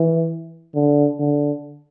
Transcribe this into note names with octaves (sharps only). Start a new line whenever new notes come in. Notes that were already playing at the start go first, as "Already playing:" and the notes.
Already playing: E3
D3
D3